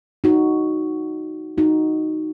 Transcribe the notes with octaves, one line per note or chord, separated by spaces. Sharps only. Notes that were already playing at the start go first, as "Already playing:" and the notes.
D#4 F#4
D#4 F#4